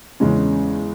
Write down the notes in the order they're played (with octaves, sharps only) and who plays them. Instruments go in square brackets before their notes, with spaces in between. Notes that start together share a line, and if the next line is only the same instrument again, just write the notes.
[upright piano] E2 C#3 G#3 C#4